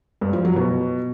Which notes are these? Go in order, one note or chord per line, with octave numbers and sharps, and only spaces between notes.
G2
F3
F#3
B2